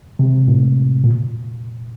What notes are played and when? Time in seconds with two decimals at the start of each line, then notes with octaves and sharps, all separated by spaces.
0.19 C3
0.48 A2
1.04 A#2